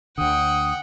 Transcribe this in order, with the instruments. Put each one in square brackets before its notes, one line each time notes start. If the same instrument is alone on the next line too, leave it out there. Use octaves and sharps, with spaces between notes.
[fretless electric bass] D2 D3 [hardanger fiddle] F#5 G5 [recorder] D#6